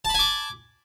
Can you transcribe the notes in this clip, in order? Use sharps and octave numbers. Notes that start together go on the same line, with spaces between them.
G#5 A5 B5 D6